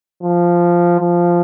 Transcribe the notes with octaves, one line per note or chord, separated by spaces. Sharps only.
F3
F3